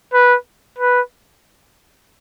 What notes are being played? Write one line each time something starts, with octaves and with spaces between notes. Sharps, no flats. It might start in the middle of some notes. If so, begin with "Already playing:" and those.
B4
B4